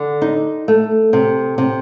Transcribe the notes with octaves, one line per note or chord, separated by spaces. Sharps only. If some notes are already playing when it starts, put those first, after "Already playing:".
Already playing: D3
D#4
A3
C3
C3